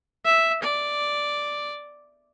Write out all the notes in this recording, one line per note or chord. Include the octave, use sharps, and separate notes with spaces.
E5
D5